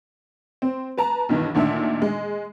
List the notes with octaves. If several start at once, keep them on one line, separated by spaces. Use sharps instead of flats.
C4
B4 A5 A#5
B1 G2 D#3 E3
D2 A#2 D#3 D4 E5
G#3